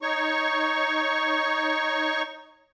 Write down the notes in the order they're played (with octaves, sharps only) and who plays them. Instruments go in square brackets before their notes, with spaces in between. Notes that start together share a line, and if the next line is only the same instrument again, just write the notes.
[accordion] D#4 C#5 C#6